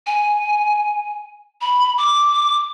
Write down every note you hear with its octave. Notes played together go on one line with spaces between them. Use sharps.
G#5
B5
D6